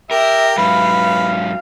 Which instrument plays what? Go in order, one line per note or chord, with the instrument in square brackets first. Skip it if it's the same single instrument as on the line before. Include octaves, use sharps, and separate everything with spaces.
[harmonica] G4 [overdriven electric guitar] A#4 [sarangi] E5
[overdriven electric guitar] G#2 F#3 [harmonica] B4 [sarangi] F5